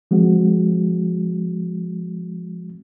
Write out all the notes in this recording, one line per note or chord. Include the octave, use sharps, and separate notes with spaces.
F3 G#3 C4 F#4